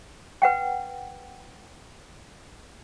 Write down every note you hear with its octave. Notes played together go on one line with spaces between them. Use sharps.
B4 F#5 G5